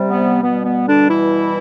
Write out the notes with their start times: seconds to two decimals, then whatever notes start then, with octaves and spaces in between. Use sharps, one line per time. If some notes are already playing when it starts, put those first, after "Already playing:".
Already playing: C3 G3
0.09 B3
0.42 B2 G3 B3
0.64 B3
0.87 D3 D4
1.09 E3 E4